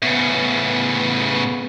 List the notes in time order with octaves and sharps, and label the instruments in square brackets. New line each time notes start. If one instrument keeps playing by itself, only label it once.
[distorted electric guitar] A2 C#3 [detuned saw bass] B3